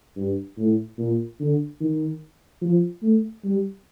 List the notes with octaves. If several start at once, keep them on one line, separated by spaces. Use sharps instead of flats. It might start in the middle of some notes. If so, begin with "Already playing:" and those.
G2
A2
A#2
D3
D#3
F3
A3
G3